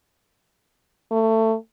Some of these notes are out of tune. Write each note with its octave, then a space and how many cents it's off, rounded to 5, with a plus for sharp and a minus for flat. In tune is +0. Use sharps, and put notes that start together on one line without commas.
A3 +20